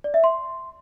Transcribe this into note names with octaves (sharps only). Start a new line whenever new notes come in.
D5
E5
C6